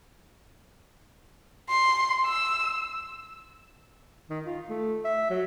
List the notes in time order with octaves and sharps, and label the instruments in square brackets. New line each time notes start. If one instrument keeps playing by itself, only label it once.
[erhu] C6
E6
[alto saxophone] D#3
F4
A3
E5
F#3